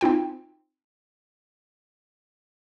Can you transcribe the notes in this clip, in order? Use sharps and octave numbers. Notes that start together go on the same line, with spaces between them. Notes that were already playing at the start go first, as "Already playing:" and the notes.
C4 D#4 F4 G5